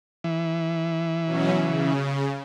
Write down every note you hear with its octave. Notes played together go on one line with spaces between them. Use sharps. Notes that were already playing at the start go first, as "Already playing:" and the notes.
E3
B2 F#3 C#4
C#3